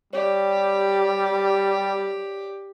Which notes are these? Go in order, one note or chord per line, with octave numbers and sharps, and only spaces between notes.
G3 G4 C#5 D5